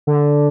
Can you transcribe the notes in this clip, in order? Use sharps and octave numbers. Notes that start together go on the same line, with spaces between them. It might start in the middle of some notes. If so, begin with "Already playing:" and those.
D3